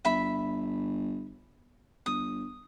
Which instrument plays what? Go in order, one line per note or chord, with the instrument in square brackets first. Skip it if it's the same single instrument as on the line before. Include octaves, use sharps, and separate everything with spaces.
[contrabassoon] G1 [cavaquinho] E5 B5
[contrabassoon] G1 [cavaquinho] D#6